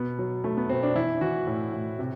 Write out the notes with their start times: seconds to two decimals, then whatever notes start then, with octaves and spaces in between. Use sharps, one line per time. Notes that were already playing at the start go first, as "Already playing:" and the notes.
Already playing: B2 B3
0.19 F#3
0.44 F#3 A3
0.57 B3
0.69 B2 C4
0.83 D4
0.95 E3 E4
1.21 E3 F#4
1.47 A2
1.74 A2
1.99 C3